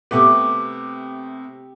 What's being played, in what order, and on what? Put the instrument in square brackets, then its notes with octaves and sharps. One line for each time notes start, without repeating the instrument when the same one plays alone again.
[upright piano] C3 A3 B3 [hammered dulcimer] G4